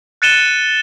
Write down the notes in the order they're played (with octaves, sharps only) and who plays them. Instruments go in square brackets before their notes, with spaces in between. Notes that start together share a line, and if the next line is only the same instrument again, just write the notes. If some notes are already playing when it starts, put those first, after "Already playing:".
[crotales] F#6 A6 C#7 D#7 E7 G7